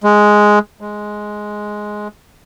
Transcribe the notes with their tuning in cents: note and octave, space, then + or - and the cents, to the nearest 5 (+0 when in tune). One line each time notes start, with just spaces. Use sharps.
G#3 +5
G#3 +5